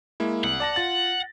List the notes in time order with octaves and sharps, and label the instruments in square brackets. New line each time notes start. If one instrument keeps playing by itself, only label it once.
[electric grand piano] G#3 A#3 E4
[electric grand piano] C2 [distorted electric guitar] F#5
[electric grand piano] D5 A5 A#6
F4 A6